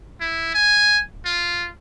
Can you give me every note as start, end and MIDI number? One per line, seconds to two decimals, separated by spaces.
0.21 0.54 64
0.54 1.00 80
1.26 1.68 65